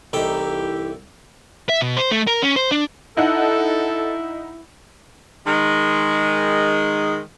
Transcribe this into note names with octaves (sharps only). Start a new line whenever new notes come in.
C2 E3 D#4 G4 A4 G5
E5
B2
C5
A3
A#4
C#4
C5
D4
D#4 E4 A4 F#5
D#3 G#3